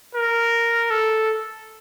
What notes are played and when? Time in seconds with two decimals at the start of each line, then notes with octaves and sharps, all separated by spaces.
0.15 A#4
0.91 A4